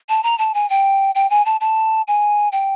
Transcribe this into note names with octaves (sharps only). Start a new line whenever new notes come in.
A5
A#5
A5
G#5
G5
G5
G#5
A5
A5
G#5
G5